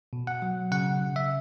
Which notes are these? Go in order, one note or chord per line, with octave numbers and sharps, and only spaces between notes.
B2
F#5
F#3
C#3 F#5
C#3
E5